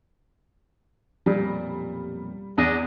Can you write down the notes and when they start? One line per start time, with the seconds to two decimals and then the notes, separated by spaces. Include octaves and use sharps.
1.26 B1 F2 A#2 G3
2.58 E2 D4 D#5